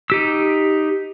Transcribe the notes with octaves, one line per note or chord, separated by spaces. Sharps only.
D#4 G4 E6